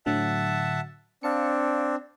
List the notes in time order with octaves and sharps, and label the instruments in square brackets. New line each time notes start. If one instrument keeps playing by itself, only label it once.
[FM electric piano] A2 D3 F#3 [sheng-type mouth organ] E5 F#5 A5
[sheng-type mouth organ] C4 D4 [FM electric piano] F5 A5 C#7